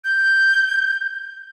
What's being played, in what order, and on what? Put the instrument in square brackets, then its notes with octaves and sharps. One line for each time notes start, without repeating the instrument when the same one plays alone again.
[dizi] G6